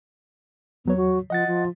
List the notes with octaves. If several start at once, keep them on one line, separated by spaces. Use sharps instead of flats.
E2 F#3 B3 C#5
F#4
F3 D#5 F#5 A6
F3